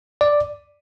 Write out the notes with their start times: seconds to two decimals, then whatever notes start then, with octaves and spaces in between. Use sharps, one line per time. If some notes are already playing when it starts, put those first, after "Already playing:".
0.21 D5